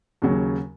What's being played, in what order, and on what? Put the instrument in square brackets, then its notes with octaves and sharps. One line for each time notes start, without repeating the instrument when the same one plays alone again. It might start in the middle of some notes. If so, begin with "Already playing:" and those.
[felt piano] D#2 C#3 F#3